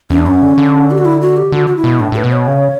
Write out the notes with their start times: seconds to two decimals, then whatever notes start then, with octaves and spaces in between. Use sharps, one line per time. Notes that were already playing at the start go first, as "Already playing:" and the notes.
0.10 E2 C#4
0.18 D4
0.26 F#2 C#4
0.42 D3
0.58 D3
0.91 G4
0.98 F#4
1.05 E4
1.21 F#4
1.37 G4
1.52 D3 F#4
1.66 F#4
1.76 E4
1.84 B2
2.00 A2 D4
2.12 A2 B4
2.24 B2
2.31 C#5
2.47 C#3